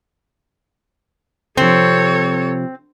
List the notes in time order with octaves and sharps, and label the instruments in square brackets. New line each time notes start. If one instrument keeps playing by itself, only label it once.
[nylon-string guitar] C3 F3 [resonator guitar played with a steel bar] C4 [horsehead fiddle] A4 C#5